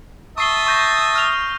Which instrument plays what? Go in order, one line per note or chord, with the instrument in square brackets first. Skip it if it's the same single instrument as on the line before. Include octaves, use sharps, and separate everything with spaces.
[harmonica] E5 A5 D#6 [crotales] C#6 C7 G7
[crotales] C#6 G6 A#6
F6 F7